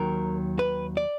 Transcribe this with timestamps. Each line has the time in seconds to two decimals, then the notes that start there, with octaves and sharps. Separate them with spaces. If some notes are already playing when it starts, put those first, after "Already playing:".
Already playing: D#2 D#3 F#3 A#4
0.59 B4
0.97 D5